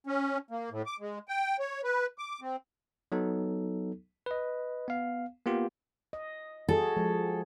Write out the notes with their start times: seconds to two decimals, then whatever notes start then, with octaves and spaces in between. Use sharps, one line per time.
0.07 C#4
0.51 A#3
0.71 A2
0.86 D6
1.00 G#3
1.28 G5
1.59 C#5
1.84 B4
2.18 D6
2.41 C4
3.12 F#3 B3 D#4 A4
4.26 B4 D#5
4.88 B3 F5
5.46 A#3 B3 F4 G4
6.13 D#5
6.68 F#4 G#4 A4 D#5
6.97 F3 G#3